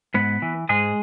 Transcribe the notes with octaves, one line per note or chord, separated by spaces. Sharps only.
G#2 B3 B4
E3
G#2 G#3 G#4